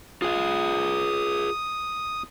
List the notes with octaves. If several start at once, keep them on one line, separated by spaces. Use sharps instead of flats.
F4 G#4 F5 D#6